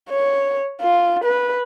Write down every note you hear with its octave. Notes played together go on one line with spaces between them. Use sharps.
C#5
F4
B4